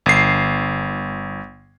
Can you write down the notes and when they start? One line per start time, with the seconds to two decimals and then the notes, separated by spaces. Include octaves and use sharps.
0.06 G1 C7